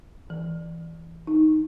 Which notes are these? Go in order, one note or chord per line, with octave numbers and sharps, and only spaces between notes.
E3
D#4